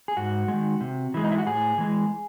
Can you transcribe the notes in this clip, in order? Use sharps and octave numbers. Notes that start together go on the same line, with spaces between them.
G#4
G#2 F#4
G#3
D#3
C3
E3 G#3
D#4
E4
F#4
A2 G#4
E3 G#3